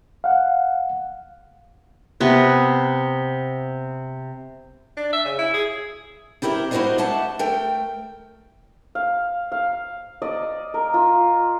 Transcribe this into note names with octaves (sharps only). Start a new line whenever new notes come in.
F5 F#5
C3 B3
D4
E5
C#3
E4
G#4
C4 E4 G4 A#4 E5
E4 F#4 G4 A#4 C5 D#5
A3 G4 E5 F#5 A5
A3 A#4 G5
F5
F5
D5 D#5
A#4
F4